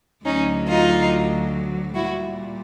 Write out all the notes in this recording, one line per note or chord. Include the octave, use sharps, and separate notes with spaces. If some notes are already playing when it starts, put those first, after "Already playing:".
D2 D3 F#3 C#4 D#4
D#4 F4
A#2 G3 E4 F#4